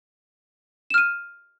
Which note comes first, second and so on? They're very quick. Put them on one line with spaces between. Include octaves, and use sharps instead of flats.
E7 F6 D#7